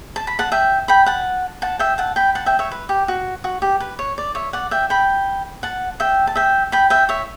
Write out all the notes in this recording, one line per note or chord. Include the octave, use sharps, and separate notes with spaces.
A5
B5
F#5 A5
E5 G5
G5 B5
F#5 A5
F#5 A5
E5 G5
F#5 A5
G5 B5
F#5 A5
E5 G5
C#5 E5
B4
G4
F#4
F#4
G4
B4
C#5
D5
C#5 E5
D5 F#5
E5 G5
G5 B5
F#5 A5
E5 G5
A5
E5 G5
G5 B5
E5 G5
C#5 E5